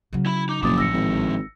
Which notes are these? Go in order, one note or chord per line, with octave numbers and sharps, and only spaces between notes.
C#3 F#3
E4 B5
D#4 D6
F#1 B2 D3 F3 D6 D#6 A6
A1 E6 A#6 C#7
G#1